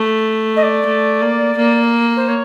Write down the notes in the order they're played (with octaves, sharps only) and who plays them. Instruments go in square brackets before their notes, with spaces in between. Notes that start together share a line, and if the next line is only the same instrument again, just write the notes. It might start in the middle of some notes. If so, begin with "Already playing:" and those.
Already playing: [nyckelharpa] A3
[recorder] D#5
D5
[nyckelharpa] A3
A#3
A#3
[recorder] C5
C#5